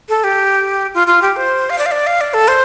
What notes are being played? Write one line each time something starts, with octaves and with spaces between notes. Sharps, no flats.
A4
G4
F4
F4
G4
C5
F5
D5
F5
D5
F5
D5
A4
C5